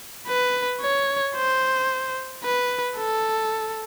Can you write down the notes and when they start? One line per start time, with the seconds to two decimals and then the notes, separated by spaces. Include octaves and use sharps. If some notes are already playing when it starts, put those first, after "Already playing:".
0.28 B4
0.82 C#5
1.36 C5
2.44 B4
2.98 A4